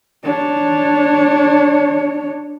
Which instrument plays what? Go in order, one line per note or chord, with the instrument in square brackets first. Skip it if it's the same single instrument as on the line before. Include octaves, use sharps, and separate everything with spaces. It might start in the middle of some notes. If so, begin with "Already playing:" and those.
[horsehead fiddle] D4 C#5